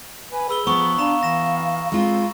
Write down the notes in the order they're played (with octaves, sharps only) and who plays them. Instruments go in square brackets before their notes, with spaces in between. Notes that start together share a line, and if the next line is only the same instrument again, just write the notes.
[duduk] B4 [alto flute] G#5
[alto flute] G#4 [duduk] B4 [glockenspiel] B5 E6 G7
[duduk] F3 [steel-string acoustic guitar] B3 [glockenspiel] A#5 C#6 D#6
[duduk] D4 [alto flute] F5 [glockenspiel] A#5 E7
[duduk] E3 [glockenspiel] A#6 E7
[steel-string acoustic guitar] G#3 F4 [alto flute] C4